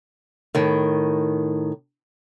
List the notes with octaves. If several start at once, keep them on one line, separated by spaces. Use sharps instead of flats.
A2 D#3